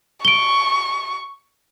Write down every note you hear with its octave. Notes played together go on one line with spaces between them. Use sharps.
C#6 D7 G7